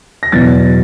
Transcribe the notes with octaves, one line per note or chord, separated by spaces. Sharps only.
A#6
E2 B2 F#3 A6